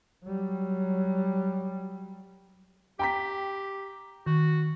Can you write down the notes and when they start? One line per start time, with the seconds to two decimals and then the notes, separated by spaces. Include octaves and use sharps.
0.24 F#3 G3
2.99 G4 G5 A#5 B6
4.27 D#3 F#4